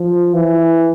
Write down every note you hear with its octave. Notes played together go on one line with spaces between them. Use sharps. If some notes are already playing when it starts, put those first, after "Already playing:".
Already playing: F3
E3